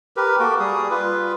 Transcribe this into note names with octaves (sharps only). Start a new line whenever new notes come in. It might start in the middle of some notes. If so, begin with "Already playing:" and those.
G4 A#4 B4
A#3 F#4 A4 D6
G3 G#4 D#6
F4 B4